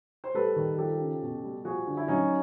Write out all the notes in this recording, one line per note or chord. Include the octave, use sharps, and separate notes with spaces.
C5
G3 A4 B4
D#3
F3 G4 A4
C#3
B2
G3
F3 F#4 G#4
D3
E4
F#3 C#4 D#4